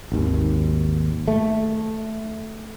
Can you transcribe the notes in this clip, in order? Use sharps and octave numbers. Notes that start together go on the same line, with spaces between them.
G#1 D#2
A3